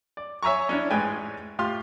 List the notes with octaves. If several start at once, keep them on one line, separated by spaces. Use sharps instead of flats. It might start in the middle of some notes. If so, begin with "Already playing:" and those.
D5
C#5 E5 G#5 A#5 C#6
C#4 D4 E4
A1 G#2 G#3 B4 G5 G#5
A2 F4 G4 C6 F6